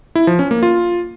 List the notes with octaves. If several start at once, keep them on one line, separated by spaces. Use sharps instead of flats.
E4
F3
C#4
A#3
F4